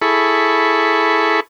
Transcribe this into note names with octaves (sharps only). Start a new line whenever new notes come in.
E4 G#4 A4 B5 C#6